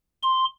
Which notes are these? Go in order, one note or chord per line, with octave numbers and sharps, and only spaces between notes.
C6